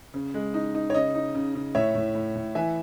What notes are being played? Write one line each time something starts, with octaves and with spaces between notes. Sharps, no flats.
C#3
G#3
D#4
D#4
C#5
C#3 D#5
D#4
C#3
C#3
A2 C#5 E5
A2
A2
A2
E3 E5 G#5